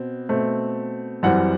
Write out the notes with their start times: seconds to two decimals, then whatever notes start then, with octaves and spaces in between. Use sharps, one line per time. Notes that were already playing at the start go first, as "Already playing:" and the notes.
Already playing: B2 C4
0.29 B2 A3 C4
1.23 F#2 E3 G3 C4 F#5